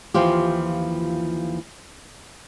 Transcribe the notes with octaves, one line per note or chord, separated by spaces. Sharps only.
D#2 E3 F3 F4 G4